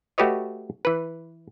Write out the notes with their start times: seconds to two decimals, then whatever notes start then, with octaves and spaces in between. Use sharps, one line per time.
0.18 A3 F#4 G4 B4 C#5 D#5
0.85 E3 B4